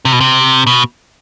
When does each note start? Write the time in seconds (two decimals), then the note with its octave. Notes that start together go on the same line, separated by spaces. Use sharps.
0.05 C3
0.12 B2
0.20 C3
0.67 B2